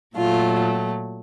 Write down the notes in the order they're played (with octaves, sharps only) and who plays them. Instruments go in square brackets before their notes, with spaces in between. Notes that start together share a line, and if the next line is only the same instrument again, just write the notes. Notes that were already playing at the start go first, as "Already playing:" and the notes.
[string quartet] A#2 F#3 A3 F4